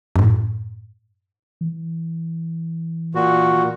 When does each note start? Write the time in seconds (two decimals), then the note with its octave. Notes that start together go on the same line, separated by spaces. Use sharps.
0.16 F#2 A2
1.61 E3
3.15 A#2 F#4